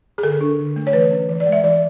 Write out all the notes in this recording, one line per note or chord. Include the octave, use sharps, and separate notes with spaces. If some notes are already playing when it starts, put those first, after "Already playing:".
G#4
D3 A4
D4
D3
A3
C#5
E3 B4
C#4
E3
D5
G#3
E5
E3 D5